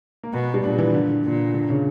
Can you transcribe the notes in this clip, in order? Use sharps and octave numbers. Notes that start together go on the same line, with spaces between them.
A#3
B2 B3
G3
A#2 D4
E3
D3
A#2
D3
C#3